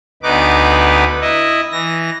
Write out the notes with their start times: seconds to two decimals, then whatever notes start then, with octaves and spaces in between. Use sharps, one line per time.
0.23 D2 B3 D#4 B4 D6
1.21 E4 D#5
1.72 E3 A#6